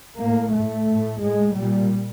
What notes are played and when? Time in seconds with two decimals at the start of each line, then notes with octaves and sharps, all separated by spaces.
0.21 A2 A#3
0.55 A2 A3
0.90 A2
1.22 A2 G#3
1.56 A#2 G3